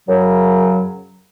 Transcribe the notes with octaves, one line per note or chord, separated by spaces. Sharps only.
F#2 C#3 F#3